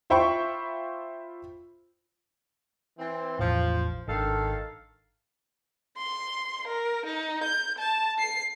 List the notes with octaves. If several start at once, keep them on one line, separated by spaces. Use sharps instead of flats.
F4 C5 E5 G5 B5 C#6
E3 C4
A1 E2 A2 F3
G#1 D#3 D4 A4 F5
C6
A#4
D#4
G6
A5
C7